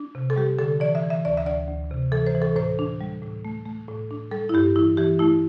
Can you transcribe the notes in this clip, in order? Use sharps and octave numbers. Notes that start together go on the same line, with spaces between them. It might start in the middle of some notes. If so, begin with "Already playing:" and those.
Already playing: D4
C3
A4
G3 G4
D3 A4
E3 D5
E5
E3
E5
D2 D5
E5
D2 D5
D2
C3
E3 A4
C5
E3
A4
A2 C5
D4
G3
A2
A3
A3
A2
D4
G3 A4
E4
G2 G4
E3 E4
E3 G4
A3 E4